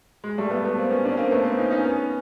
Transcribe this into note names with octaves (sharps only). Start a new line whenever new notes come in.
G#3
G3 A3
A3 B3
A3 B3
A#3 C4
B3 C#4
C4 D4
C#4
A#3 C4
A3 B3
A#3 C4
C#4 D#4
C#4 D#4
B3 C#4